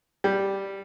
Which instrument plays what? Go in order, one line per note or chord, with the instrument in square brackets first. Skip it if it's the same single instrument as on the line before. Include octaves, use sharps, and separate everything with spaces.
[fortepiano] G3